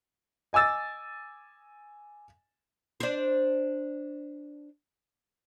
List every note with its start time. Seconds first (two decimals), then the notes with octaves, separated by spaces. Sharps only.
0.53 D#5 G#5 D6 E6 A6
3.00 D4 C5